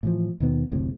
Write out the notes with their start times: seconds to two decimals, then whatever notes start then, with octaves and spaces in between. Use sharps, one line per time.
0.03 A2 E3 F3
0.40 D#2 B2 D#3 B3
0.71 F#1 D2 A2 C3